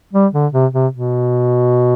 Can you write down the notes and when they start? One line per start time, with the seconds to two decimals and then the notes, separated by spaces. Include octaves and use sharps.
0.13 G3
0.33 D3
0.53 C3
0.73 C3
0.92 B2